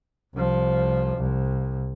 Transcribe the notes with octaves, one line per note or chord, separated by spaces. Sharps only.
C2 F3
C2